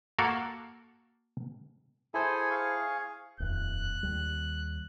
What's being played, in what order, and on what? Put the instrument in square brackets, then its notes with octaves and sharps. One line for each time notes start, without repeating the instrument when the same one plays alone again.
[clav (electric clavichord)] A#3 F#4 A4 A#4
[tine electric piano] E4 C5 [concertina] G#4 A4 G#5
[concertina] G#4 F5 C#6
[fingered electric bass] D#1 F2 [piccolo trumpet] F#6
[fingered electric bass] D#2 G3